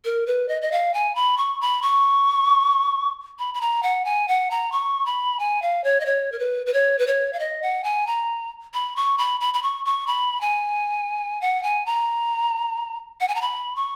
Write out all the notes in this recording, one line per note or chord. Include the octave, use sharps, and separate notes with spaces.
A#4
B4
D#5
D#5
F5
G#5
B5
C#6
B5
C#6
B5
B5
A#5
F#5
G#5
F#5
A#5
C#6
B5
G#5
F5
C#5
D#5
C#5
A#4
B4
B4
C#5
B4
C#5
F5
D#5
F#5
G#5
A#5
B5
C#6
B5
B5
B5
C#6
C#6
B5
G#5
F#5
G#5
A#5
F#5
G#5
A#5
B5
C#6